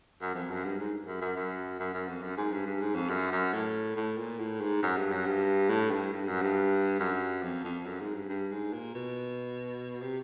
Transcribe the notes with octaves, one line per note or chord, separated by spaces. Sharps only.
F#2
F2
F#2
G2
G#2
F#2
F#2
F#2
F#2
F#2
F2
F#2
G#2
G2
G2
G#2
F2
F#2
F#2
A2
A2
A#2
A2
G#2
F#2
G2
F#2
G2
A2
G2
G2
F#2
G2
F#2
F2
F2
F#2
G#2
G2
G2
G#2
A#2
B2
C3